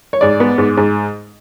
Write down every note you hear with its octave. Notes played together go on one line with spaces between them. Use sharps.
C#5
G#2 D5
B3
G#2
G#2